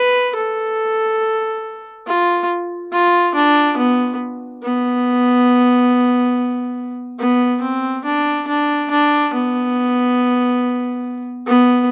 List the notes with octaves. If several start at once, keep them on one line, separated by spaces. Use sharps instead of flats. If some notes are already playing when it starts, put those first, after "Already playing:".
Already playing: B4
A4
F4
F4
D4
B3
B3
B3
C4
D4
D4
D4
B3
B3